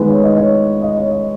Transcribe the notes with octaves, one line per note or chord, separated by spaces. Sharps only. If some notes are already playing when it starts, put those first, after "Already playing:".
Already playing: D#3 G#3 B3 B4
C#5
D#5
C#5
D#5
C#5
D#5